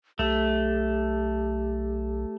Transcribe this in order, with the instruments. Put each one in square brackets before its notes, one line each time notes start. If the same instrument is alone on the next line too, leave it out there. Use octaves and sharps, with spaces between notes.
[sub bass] B1 [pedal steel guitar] A3 [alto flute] G4